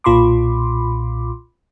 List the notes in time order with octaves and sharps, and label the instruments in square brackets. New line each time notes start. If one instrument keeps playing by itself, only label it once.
[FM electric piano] B1 A#2 F4 B5 C6 D6